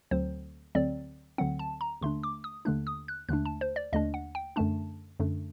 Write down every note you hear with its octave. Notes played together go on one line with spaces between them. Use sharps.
D2 D3 F#3 C4 C5
D2 D3 F#3 C4 D5
D2 D3 F#3 C4 F#5
A5
A#5
D#2 D3 A3 D4 C6
D6
D#6
D#2 D3 A3 D4 F#6
D#6
F#6
D#2 D3 A3 D4 F#6
A5
C5
D5
D#2 D3 A3 D4 D#5
F#5
G5
F#2 D3 A3 D4 A5
F#2 D3 A3 D4